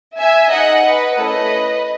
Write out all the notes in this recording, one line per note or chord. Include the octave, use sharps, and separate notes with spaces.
E5 G#5
D#4 G#4 D#5 F#5
B4 D#5
A3 C#4 E4 A4 B4 D#5